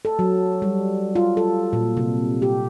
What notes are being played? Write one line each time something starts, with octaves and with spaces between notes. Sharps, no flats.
A4
F#3
G3
F4
A4
A#2
C3
G4